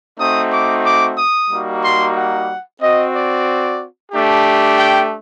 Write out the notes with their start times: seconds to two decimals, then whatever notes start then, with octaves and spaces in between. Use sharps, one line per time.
0.19 A3 C4 D#4 F#4 D#6
0.52 D6
0.85 D6
1.18 D#6
1.50 G3 A#3 D#4 F#4
1.83 C6
2.15 F#5
2.81 C4 F#4 D#5
3.14 D5
4.12 A3 D4 G4
4.78 G5